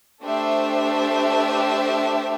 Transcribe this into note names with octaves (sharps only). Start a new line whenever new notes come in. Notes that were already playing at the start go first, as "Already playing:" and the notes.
A3 D4 G4 C5 E5